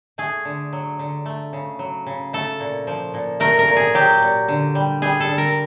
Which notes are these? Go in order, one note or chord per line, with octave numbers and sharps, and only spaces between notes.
A3 G#4
D3
F#3
D3
A3
C#3
F#3
C#3
A3 A4
A#2
F3
A#2
A3 A#4
A#4
A#2
G#4
F#3 G4
A#2
D3
G3
G3 G#4
A4
D3
A#4